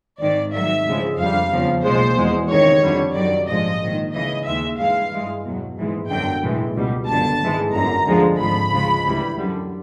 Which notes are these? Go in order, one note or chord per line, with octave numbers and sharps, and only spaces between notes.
G#1 G#2 D#3 D5
G#1 G#2 D#3 F#3 E5
D2 C#3 F3 G#3
F2 D3 G3 F5
E2 C#3 F3
B1 A#2 F3 G#3 C5
E2 B2 G#3
C#2 C3 D#3 C#5
F2 D3 G3
F#2 D#3 F#3 D5
A#1 G#2 F3 G#3 D#5
A#1 G#2 D#3
C#2 C#3 E3 D#5
D#2 D#3 G#3 E5
G2 E3 G#3 F5
G2 E3 G#3
E2 B2 F#3
A#1 G#2 E3 G#3
G1 F#2 D3 F#3 G5
B1 A2 E3 G#3
C#2 B2 G3
G1 F#2 D3 A5
G#1 G#2 E3 G#3
G1 F#2 D3 A#5
D2 D3 F3 G#3
G#1 G#2 F3 B5
C#2 C#3 F3 G#3
D2 C#3 E3 G3
F#2 D3 G3